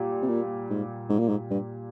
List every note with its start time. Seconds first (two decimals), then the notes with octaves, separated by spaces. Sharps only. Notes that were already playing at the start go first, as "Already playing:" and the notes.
Already playing: A#2 G3
0.22 C3
0.29 A#2
0.70 G#2
1.09 G#2
1.19 A#2
1.29 G#2
1.51 G2